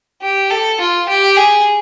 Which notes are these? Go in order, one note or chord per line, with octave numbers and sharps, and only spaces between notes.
G4
A4
F4
G4
G#4